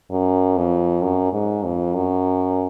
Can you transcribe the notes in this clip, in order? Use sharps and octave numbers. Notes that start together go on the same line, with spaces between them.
F#2
F2
F#2
G#2
F2
F#2